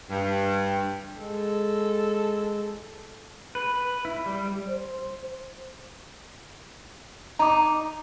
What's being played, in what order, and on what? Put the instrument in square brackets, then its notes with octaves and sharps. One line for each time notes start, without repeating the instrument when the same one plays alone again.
[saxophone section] G2
[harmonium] G#3 [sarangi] A4
[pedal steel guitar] B4
B4
E4
G3
[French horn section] C5
[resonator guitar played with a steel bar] D#4 [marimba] A#5 D6